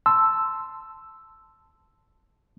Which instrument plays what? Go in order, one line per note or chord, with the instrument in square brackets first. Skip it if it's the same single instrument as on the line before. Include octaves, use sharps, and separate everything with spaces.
[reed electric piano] A5 C6 E6